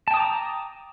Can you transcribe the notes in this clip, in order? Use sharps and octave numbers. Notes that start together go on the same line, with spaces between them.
G5 A5 A#5 D6 D#6